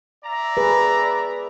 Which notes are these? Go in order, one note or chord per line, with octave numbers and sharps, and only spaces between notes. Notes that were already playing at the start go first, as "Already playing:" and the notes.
D5 E5 A#5
G#4 B4